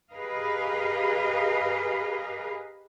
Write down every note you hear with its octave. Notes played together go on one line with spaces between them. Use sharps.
G4 G#4 A#4 B4 D#5 F5